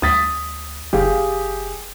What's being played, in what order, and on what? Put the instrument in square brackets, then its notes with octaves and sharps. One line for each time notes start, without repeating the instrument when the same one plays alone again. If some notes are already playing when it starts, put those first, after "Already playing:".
[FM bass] D2 [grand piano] D#6 A6 B6
[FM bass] F#1 [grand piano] G4 G#4 F5